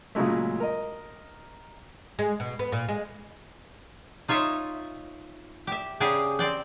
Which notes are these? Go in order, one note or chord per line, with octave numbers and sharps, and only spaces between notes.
A#2 C#3 F#3 G#3 A3
A#4 D#5
G#3
B2
B3
A#2
G#3
D#4 F4 C#5 D#5 E5
G4 E5
C#3 D4 G4 G#4
C4 D5 G5